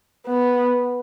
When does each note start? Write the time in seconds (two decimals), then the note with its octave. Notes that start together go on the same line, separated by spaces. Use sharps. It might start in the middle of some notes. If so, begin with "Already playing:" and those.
0.27 B3